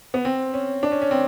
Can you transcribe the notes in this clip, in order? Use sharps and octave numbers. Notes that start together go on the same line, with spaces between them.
B3
C4
C#4
D4
C#4
C#4
C4